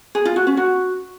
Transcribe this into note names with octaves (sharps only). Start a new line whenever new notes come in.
G#4
F4
F#4
C#4
F#4